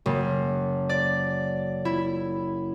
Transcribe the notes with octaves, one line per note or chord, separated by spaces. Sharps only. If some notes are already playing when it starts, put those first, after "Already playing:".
F#1
D5
E4